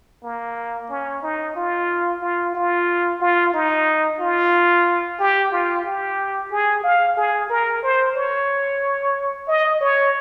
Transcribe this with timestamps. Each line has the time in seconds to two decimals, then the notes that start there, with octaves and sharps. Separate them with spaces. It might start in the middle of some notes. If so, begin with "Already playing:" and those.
0.23 A#3
0.90 C#4
1.23 D#4
1.56 F4
2.22 F4
2.55 F4
3.21 F4
3.54 D#4
4.20 F4
5.19 G4
5.52 F4
5.85 G4
6.51 G#4
6.84 F5
7.17 G#4
7.50 A#4
7.83 C5
8.16 C#5
9.48 D#5
9.81 C#5